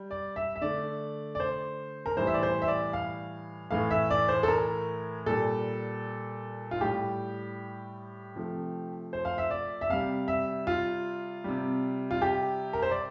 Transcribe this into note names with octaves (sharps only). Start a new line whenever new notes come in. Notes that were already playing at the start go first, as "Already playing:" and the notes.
Already playing: G3
D5
E5
E5
D3 A3 D5
D5
C5
A#4
A2 E3 G3 C5
E5
D5
C5
E5
D5
F5
A2 E3 A3 F5
E5
D5
C5
A4
A#4
A#2 G3 A4
F4
A2 G3 G4
C3 F3 A3
C5
F5
E5
D5
E5
C3 G3 F5
E5
F4
C3 G3
F4
G4
A#4
C5
D5